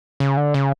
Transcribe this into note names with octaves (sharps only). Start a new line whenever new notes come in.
C#3
D3
C#3